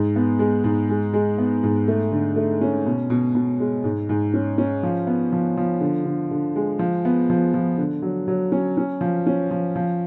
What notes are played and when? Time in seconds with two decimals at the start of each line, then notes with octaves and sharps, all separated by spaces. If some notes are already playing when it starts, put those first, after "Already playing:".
Already playing: G#2 G#3
0.16 B3
0.39 G#3
0.64 G#2
0.89 G#3
1.14 G#3
1.38 B3
1.63 G#2
1.88 A3
2.12 D3
2.36 A3
2.61 C#4
2.86 B2
3.10 B2
3.35 B2
3.60 G#3
3.84 G#2
4.09 G#2
4.34 C#4
4.58 C#4
4.83 F3
5.07 B3
5.32 F3
5.57 F3
5.81 D3
6.05 D3
6.31 D3
6.56 G#3
6.79 F3
7.05 B3
7.30 F3
7.54 F3
7.78 D3
8.02 F#3
8.28 F#3
8.52 C#4
8.77 C#4
9.01 F3
9.27 C#4
9.51 F3
9.76 F3